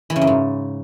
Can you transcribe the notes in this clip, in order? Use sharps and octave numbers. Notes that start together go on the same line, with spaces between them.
E3
C#3
F#2
G#2